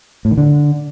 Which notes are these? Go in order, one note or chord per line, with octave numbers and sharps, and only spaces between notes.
A2
D#3
D3